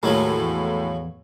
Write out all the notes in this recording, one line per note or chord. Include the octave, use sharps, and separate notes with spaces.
D#2 A2 F3 F#3 G#3 A#3
E2